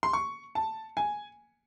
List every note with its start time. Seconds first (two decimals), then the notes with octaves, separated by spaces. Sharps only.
0.03 C6
0.13 C#6
0.55 A5
0.97 G#5